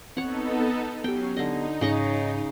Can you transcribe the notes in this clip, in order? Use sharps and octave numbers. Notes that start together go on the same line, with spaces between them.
B3 C4 D#4 A4 C#5 F#5
F#3 B3 C#4 G4 G5 C7
D3 D#4 D#5
G#2 C#3 C#5 D#5 C#6